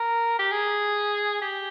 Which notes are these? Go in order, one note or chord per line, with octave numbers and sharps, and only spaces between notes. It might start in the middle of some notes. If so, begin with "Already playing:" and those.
Already playing: A#4
G4
G#4
G4